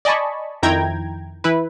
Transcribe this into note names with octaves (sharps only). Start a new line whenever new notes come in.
D5 D#5 G#5 A5 B5 C#6
F2 D#3 E4 G5 A#5 G#6
E3 E4 B4